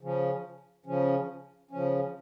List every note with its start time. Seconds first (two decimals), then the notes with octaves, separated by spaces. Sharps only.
0.01 C#3 F3 C#4
0.86 C#3 F3 C#4
1.71 C#3 F3 C#4